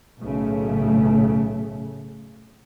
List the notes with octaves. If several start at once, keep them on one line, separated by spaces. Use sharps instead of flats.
B1 A2 C#3 A3